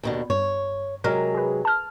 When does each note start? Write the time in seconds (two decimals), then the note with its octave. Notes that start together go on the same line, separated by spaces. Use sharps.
0.03 D#2 B2 D3
0.30 G2 C#5
1.04 C3 F#3 G#3 A#4
1.35 G#4 B4
1.65 A5 F6